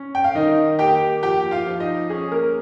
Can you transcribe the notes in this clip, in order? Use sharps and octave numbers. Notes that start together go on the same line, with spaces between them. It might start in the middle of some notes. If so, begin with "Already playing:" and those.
Already playing: C#4
G5
F5
D#3 D#4 D#5
A#3 G4 G5
F3 G4 G5
F4 F5
F3
D#4 D#5
C#4 G#4
A#3 A#4